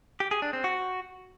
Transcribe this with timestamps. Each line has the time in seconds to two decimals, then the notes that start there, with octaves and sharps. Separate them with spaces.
0.20 G4
0.31 G#4
0.42 D4
0.53 C4
0.64 F#4